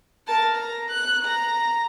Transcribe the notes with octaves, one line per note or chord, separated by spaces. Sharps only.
A#4 A5
A#5
F#6
A#5